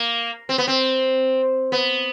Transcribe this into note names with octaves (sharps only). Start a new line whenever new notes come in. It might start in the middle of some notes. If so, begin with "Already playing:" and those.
Already playing: A#3
C4
B3
C4
B3